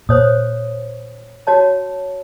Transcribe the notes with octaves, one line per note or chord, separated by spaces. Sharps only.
A#2 C5 C#5 D#6
F#4 C#5 A5